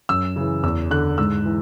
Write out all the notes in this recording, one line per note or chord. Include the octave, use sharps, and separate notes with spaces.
F#2 E6
C#3 E3
E2 E6
D3 F#6
G#2 E6
E3